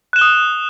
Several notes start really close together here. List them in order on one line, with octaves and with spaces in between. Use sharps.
F#6 E7 G7 D#6